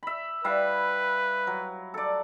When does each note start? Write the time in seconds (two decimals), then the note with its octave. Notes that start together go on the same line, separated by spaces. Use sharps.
0.03 E5 B5
0.44 G3 E4 B4 F5
1.47 F#3
1.94 A4 D5